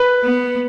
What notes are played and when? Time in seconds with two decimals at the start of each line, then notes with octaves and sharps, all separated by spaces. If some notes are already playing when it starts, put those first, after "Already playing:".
Already playing: B4
0.24 B3